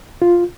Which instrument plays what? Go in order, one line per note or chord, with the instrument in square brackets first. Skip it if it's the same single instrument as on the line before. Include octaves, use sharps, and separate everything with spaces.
[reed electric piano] F4